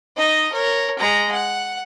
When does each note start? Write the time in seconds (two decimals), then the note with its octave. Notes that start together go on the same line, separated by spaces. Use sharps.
0.17 D#4 D#5
0.52 A#4 C#5
0.98 G#3 A#5
1.31 F#5